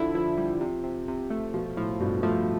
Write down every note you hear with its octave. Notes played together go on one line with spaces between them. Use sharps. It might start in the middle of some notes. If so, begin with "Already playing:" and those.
Already playing: D3 F3 E4
F3 E4
G3
C3
C3
C3
A3
B2 F3
A2 F3
G2 B2
F3 A3